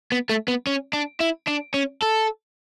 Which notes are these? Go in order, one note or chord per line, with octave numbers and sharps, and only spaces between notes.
B3
A3
B3
C#4
D4
E4
D4
C#4
A4